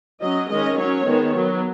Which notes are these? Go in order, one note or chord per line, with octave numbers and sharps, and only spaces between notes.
F#3 C#4 D#5
D#3 G#3 C#4 D#5
F#3 C#4 C#5
D#3 G#3 B3
F#3 B3